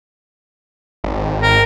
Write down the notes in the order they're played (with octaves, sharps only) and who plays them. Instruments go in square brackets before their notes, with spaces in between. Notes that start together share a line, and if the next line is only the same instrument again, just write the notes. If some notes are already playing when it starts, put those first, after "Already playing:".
[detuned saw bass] G#1
[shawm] A#4